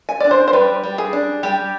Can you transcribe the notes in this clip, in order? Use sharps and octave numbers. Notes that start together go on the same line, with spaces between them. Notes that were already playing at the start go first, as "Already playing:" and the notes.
G#5
D4 D5
C5
C5
G3 B4
G3
G#4
D4
G3 G4